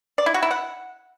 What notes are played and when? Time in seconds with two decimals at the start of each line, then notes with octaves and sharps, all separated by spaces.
0.18 D5
0.26 E4
0.34 F#4
0.43 E4
0.51 F#5